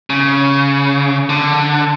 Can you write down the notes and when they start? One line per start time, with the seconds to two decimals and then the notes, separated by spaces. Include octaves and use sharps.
0.10 C#3
1.29 D3